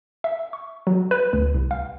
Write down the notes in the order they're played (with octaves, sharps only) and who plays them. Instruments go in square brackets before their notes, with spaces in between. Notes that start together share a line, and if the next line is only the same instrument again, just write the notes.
[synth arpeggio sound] E5
C#6
F#3
B4
D2
C2
F5